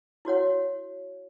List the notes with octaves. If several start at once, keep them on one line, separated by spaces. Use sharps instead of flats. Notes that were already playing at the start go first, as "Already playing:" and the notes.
E4 F#4 C#5 F#5